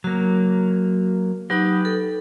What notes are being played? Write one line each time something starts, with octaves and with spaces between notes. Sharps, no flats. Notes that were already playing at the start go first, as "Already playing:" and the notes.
F#3 A#3 F#4
F#3 D#4 G4 B4 D#6
A4